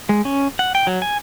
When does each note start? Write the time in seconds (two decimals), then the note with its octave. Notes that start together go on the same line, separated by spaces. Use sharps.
0.09 G#3
0.25 C#4
0.59 F#5
0.75 G5
0.87 F#3
1.02 G#5